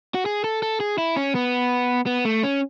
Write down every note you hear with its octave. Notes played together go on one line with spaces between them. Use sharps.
F#4
G#4
A4
A4
G#4
E4
C#4
B3
B3
A3
C#4